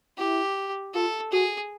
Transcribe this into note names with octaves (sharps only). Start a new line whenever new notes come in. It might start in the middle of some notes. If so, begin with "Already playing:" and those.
E4 G4
F4 A4
F#4 G#4